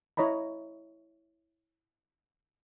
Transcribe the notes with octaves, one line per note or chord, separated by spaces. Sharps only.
E4 C#5 D#5 A#5 B5